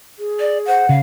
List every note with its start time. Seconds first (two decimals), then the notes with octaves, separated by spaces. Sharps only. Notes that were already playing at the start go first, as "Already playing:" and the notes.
0.19 G#4
0.39 D5
0.67 C5 F#5
0.89 C#3 F5